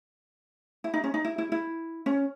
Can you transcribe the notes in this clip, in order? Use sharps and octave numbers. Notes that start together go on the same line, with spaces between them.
E4
D#4
C#4
D#4
E4
E4
E4
C#4